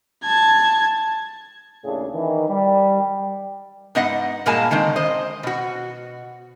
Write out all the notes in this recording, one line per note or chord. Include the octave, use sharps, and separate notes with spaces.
A5 G#6
D#2 A2 C#3 D4 G#4
D#3 E3
G3
G#2 B3 D#5 F#5
G2 A#2 G#3 A#3 G#5 A5
D3 D#3 G#3 C4
C5 D#5
B2 F#4